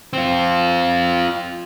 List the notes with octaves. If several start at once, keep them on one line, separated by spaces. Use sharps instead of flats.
C4 F4